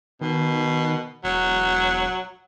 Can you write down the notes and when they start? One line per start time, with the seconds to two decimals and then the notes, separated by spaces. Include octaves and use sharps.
0.21 B2 D#3
1.24 E1 F#3